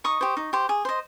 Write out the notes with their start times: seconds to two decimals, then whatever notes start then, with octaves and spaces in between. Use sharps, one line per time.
0.04 D#4 C#6 D#6
0.21 G4 C5
0.37 D#4
0.53 G4 C5
0.69 G#4
0.85 C5 D#5